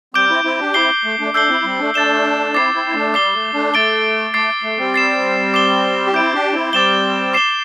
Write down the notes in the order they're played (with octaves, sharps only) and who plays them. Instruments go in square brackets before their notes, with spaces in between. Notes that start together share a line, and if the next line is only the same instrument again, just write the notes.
[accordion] G3 C4 [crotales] D6 G6 D7 G7
[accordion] C4 E4
C4 E4
D4 G4
[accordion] C4 E4 [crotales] D6 C7 G7
[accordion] A3
A3 D4
[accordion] A3 D4 [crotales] E6 G6 C7 G7
[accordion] C4 E4
G3 C4
A3 D4
[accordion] A3 D4 [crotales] A6 E7 G7
[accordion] C4 E4 [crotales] D6 A6 C7
[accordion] C4 E4
E4
A3 D4
[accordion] G3 [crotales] D6 C7 G7
[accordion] A3
A3 D4
[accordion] A3 [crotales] D6 A6 D7 G7
[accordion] A3 [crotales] D6 A6 C7
[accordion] A3
G3 C4
[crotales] A6 C7 E7
D6 C7 E7 G7
[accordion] G4
[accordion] C4 E4 [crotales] D6 G6 D7
[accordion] D4 G4
C4 E4
[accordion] G3 C4 [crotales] D6 A6 E7 G7
[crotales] D6 C7 E7 G7